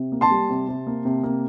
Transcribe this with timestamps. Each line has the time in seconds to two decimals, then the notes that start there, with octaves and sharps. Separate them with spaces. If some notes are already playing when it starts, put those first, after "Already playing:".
Already playing: C3
0.12 A#3
0.21 A5 C6
0.31 G3
0.50 C3
0.68 C3
0.87 A#3
1.05 C3
1.23 A#3